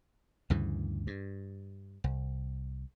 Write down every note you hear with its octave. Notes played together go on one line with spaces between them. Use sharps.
D2 G2 C#3 E3
G2
C2